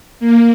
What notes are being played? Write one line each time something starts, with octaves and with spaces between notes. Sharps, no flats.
A#3